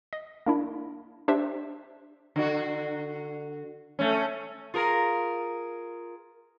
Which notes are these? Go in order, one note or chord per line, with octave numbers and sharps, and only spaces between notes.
D#5
A#3 D4 E4
D4 G4 C5 E5
D3 F#4
A3 C#4
F4 G#4 A#4